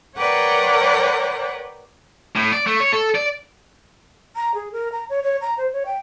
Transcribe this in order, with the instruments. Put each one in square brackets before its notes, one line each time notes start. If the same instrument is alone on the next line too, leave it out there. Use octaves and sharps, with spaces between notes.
[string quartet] A#4 B4 C#5 D5 F#5 G5
[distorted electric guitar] A2
D5
A3
C#5
A4
D5
[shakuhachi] A#5
G#4
A#4
A#5
C#5
C#5
A#5
C5
C#5
G5